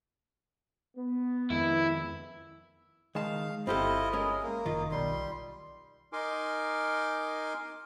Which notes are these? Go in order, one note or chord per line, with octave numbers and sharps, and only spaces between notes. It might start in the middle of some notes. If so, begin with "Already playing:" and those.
B3
F2 D#3 G#3 E4
D#3 G#3 F5 A5
G1 C4 E4 F4 G4 A4 D#5
G#3 C#4 G#4 A#4
A#3
F#1 D#3 F4
B1 G3 C6
D#4 A#4 G#5 C6 D6